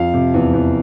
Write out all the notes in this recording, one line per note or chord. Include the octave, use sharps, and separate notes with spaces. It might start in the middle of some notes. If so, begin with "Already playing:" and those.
Already playing: F2 F5
C3
E2
E2